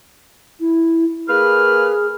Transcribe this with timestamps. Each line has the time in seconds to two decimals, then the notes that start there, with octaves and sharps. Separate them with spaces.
0.59 E4
1.28 A#3 G#4 B4 F6